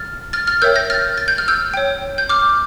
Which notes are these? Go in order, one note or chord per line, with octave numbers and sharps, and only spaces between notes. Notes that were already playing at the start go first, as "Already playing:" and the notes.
Already playing: F6 A6
F6 A6
F6 A6
A#4 C#5 E5 G5 E6 G6
G6 A#6
F6 A6
A6
G6
F6
E6 G6
C#5 G5
G6
D6 F6